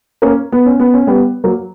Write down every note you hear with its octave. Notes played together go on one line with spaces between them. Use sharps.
A#3 C#4
B3
C#4
B3
C#4
G3 B3
F#3 A#3